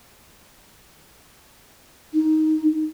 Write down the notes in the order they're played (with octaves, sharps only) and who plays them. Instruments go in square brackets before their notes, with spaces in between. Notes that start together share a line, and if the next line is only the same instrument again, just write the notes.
[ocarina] D#4